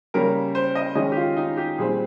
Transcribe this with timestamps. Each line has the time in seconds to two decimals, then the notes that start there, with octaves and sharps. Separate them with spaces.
0.14 C#3 G3 A#3 C#4 A#4
0.55 C5
0.75 D#5
0.95 D#3 G#3 C#4 D#5
1.12 G4
1.17 F4
1.37 D#4
1.57 G4
1.78 A#2 G3 C4 G#4